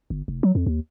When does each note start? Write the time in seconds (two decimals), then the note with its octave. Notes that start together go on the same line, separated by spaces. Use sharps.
0.10 G1
0.28 F1
0.43 F#3
0.55 F2
0.66 D#2